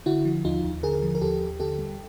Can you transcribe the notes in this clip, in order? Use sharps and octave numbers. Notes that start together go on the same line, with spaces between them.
D3 E4 F#4
F3
D#2 D#4 F4
D#2
D3 G#4 A#4
F3
A#4
D#2 G4 A4
D#2
D3 G4 A4
G3